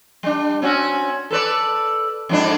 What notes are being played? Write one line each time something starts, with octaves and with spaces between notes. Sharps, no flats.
G3 D4
C4 C#4 F#4
A4 B4 D5
F2 G#2 D4